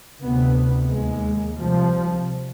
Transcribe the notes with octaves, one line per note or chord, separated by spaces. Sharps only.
D2 C3 B3
D#2 G#3
C2 C3 F3